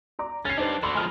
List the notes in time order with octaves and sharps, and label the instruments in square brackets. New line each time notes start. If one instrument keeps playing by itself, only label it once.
[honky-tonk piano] D5 A#5 D6
[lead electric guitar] C#4 [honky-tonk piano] A6 C7
[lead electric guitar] G2 D4 [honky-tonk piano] D#4 C5
[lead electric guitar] D3 F#4 [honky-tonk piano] B5 C6
[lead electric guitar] F3 G#3 [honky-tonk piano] B5 F6 F7